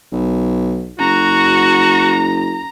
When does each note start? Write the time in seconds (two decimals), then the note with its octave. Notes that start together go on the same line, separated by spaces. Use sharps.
0.12 B1
0.99 F#1 F#4 A#5